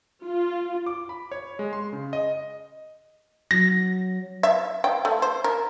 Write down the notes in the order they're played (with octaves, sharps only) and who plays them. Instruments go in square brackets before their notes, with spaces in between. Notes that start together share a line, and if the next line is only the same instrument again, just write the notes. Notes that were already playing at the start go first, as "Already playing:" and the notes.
[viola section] F4
[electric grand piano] D6
B5
C#5
G#3
C6
C#3
D#5
[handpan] F#3 [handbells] A#6
[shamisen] E5
G5
A3
C5
A#4